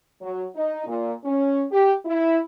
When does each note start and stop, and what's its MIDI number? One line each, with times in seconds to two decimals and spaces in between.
0.21 0.43 54
0.55 0.84 63
0.86 1.12 46
1.23 1.63 61
1.71 1.92 67
2.05 2.38 64